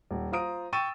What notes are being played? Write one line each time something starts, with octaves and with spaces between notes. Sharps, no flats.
D#1
F4 C5 A#5 D#6 D7
G5 C#6 E6 A6 D#7 E7